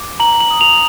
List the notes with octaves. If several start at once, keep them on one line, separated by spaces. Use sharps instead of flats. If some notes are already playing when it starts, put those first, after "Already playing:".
Already playing: D6
A#5 F#7
F#7
D#6
F7